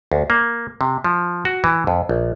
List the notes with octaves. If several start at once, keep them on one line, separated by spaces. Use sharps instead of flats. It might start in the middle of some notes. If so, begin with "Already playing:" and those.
D2
A#3
C3
F3
F#4
E3
F2
A#1